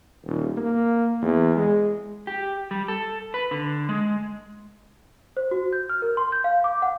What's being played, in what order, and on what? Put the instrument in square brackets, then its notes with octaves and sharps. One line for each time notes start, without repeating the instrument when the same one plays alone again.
[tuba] D#1
A#3
E2
G#3
[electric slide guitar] G4
G3
A4
B4
D3
G#3
[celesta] C5
F#4
G6
F6
A#4
C6
G6
F5
D6
F#5